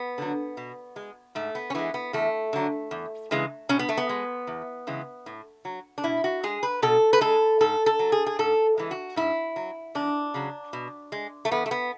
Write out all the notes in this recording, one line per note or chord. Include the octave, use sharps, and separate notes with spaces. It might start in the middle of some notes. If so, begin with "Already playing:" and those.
Already playing: B3
D3 F#3
B2
G#3
G#2 A3
B3
C#4
E3 G#3 B3
B3
E2 A3
D3 F#3
E2
C#3 E3 G#3
B2 C#4
B3
A3
B3
G#3
E2
C#3 E3 G#3
A2
F#3
D4
B2 E4
F#4
G#3 G#4
B4
B2 A4
B4
G#3 A4
G#2 A4
A4
F#3
G#4
G#4
G#2 A4
E3 G#3
F#4
G#2 E4
F#3
E2 D4
C#3 F#3
B2
G#3
A3
E2 B3
A3
B3